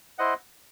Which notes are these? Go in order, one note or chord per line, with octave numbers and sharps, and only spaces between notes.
E4 C5 D#5 F#5